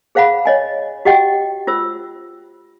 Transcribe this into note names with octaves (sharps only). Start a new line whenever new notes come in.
G#4 C5 F5 F#5 B5
C#5 D#5 G#5
F#4 G4 D#5 F#5 G5
F4 C5 E6